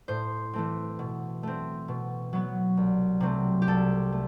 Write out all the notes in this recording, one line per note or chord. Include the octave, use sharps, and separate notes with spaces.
A2 C5
E3 A3 C4
B2
A3 C4
B2
F#3 B3
C2
C3 F#3 A3 C4
G4
C2 A4
A3